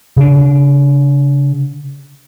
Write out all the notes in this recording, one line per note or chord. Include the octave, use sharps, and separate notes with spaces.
C#3 D4